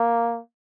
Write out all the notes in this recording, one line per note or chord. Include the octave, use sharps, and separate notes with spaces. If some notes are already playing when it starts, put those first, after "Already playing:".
Already playing: A#3